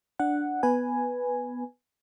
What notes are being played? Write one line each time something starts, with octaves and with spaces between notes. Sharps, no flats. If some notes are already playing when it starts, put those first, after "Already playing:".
D4 F#5
B3 B4 G#5